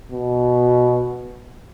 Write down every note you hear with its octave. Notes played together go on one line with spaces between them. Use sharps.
B2